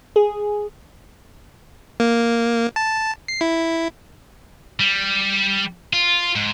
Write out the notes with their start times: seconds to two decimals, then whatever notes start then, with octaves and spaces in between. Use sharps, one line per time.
0.16 G#4
2.00 A#3
2.76 A5
3.28 C7
3.41 E4
4.80 G3
5.93 F4
6.36 G#2